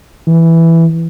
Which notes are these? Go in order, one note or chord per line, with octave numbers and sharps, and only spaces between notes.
E3